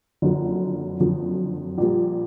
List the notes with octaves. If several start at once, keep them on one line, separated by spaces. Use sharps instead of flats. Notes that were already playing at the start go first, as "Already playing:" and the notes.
F#1 F2 D3 F#3
F#1 F2 D3 F#3
A#1 A#2 G3